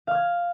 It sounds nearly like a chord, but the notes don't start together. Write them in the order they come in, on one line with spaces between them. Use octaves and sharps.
F5 F6 G#6